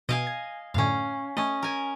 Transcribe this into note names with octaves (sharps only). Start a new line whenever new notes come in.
B2 D#5 F5 G#5 D7
G#6
F#2 A2 D3 C#4 F5
A3 C#4 D#5
A#4 G#5